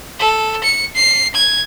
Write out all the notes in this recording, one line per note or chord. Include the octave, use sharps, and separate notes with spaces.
A4
C#7
C7
G#6